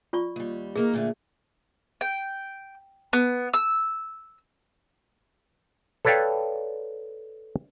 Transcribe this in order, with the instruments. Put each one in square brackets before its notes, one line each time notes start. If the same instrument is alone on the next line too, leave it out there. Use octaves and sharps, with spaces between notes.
[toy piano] F4 D5 C#6
[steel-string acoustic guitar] D#2 G3
[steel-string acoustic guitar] D#3 A#3 D#4 [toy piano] G#4
[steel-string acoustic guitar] A#2 D3 A3
[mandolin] G5
B3
E6
[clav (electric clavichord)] A4 B4 C#5 D5 F5 G5